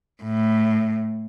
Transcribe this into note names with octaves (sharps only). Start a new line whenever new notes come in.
A2